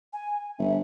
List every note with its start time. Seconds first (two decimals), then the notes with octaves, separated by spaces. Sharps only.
0.13 G#5
0.59 G1 E5